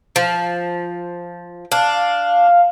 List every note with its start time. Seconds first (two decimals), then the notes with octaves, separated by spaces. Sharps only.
0.16 F3
1.72 D4 F5